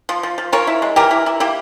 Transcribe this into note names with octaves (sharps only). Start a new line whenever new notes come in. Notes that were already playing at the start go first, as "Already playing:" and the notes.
F3
F3
F3
F3 A#4 C#5
E4
G#3
E3 G4 A#4
E4
E4
A#3 E4 G4